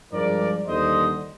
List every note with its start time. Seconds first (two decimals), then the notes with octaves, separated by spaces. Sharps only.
0.13 G2 F3 G#3 A#4 D5
0.67 D#2 D3 G3 C5 D#5